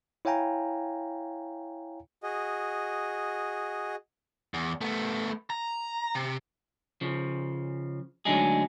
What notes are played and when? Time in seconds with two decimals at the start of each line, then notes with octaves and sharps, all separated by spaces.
0.25 E4 C#5 F5 G5 G#5 A#5
2.23 F#4 G#4 D#5
4.54 E2
4.81 A3 B3
5.50 A#5
6.15 C3
7.01 C#3 F3
8.25 D2 F#3 G#3 D4 D#4 G#4